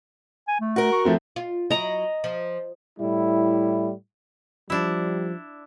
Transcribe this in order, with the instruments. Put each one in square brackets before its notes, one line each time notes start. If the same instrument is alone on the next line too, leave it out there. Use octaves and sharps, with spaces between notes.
[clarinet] G#5
A3
[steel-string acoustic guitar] F#4 A#4
[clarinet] C#6
[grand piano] F3 A3 C4 [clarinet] F4
[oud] F4
[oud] F#3 E4 [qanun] D#5 A#5
[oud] F3
[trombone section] A2 G3 E4
[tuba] F3 [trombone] G3 [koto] D4 E4